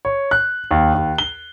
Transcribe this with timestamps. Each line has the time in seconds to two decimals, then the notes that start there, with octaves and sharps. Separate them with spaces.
0.05 C#5
0.31 F#6
0.71 D#2
0.94 D#2
1.18 G7